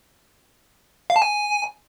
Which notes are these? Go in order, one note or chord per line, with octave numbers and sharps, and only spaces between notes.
F5
A5
G#5